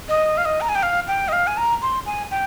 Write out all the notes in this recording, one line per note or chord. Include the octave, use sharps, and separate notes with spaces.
D#5
F5
D#5
A#5
G#5
G5
F5
G5
D#5
F5
G#5
A#5
C6
G#5
G5